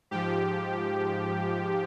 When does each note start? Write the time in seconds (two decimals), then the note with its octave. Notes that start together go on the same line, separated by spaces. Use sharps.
0.11 G#2 F3 G4